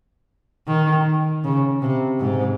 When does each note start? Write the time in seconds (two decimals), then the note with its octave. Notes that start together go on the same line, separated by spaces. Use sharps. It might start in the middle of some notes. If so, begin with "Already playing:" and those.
0.67 D#3
1.44 C#3
1.82 C3
2.20 G#2